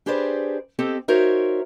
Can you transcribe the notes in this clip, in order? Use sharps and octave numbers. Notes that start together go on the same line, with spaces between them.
D4 G4 G#4 B4 C5 D5
C4 G4 A4 D#5
D#4 F#4 A#4 C5 C#5 E5